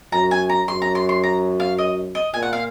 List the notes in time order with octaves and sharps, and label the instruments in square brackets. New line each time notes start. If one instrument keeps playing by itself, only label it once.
[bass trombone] F#2 [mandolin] A#5
[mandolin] G#5
A#5
[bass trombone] F#2 [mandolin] C6
[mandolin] A#5
C6
C6
A#5
F5
D#5
D#5
[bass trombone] A#2 [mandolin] G#5
[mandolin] F#5
F5